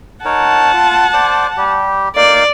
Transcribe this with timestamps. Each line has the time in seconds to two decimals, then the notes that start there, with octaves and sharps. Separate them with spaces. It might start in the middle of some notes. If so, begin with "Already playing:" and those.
0.25 D#4 A#4 C#5 F#5 A5
0.74 F4
1.14 C5 D5 D6
1.57 G3 G4
2.16 A#3 D#4 D5 F5